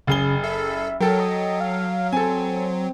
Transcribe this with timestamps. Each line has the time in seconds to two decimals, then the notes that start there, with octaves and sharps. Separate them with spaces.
0.07 F#1 C#3 G#4 G7
0.44 A4 E5
1.01 F#3 A4 A#4 G5
1.19 D#5
1.60 F5
2.13 C4 A4 G#5